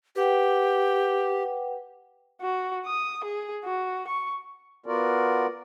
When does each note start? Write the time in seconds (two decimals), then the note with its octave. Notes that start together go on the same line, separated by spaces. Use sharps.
0.16 G4 B4 F#5 G5
2.41 F#4
2.86 D#6
3.24 G#4
3.64 F#4
4.07 C#6
4.86 B3 F4 F#4 A#4 D5